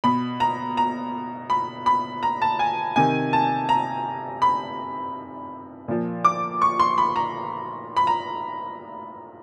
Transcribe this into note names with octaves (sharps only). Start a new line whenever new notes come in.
B2 B5
A#5
A#5
B5
B5
A#5
A5
G#5
C3 D#3 G#5
A5
A#5
B5
A#2 F3
D6
C#6
C6
B5
A#5
B5
A#5